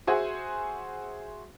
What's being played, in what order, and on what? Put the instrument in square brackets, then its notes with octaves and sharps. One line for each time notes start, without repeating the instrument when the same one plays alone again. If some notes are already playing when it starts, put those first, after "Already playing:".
[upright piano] F#4 G#4 C5 E5 F#5 G#5